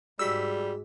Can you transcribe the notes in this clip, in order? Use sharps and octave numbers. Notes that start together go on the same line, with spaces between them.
G#2 G3 G#3 F#4 G#4 E6 B6